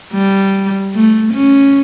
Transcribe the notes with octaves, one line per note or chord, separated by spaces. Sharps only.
G3
A3
C#4